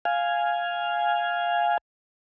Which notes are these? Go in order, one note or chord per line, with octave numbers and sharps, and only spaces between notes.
F5 G#5